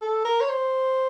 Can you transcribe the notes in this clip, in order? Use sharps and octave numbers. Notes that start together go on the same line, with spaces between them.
A4
A#4
C#5
C5